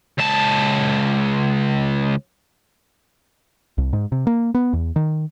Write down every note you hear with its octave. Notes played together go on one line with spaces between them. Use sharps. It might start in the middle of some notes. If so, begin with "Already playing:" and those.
C#2 A5
C2
G#2
C3
A#3
B3
E2
D#3